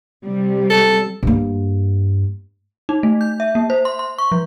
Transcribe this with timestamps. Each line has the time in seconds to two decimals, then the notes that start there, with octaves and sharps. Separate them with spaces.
0.24 C3 G3
0.70 A4
1.23 G2 A#3
2.89 D#4
3.03 A3
3.21 G6
3.40 E5
3.55 A#3
3.70 C5
3.85 C6
3.99 C6
4.18 C#6
4.32 F3